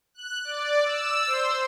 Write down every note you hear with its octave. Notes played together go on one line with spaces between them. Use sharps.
F#6
D5
E6
C5